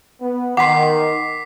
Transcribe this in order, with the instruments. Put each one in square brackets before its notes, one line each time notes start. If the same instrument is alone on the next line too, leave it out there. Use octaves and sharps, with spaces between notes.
[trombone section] B3
[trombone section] D#3 [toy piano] F#5 C6 [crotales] D6 B6 C7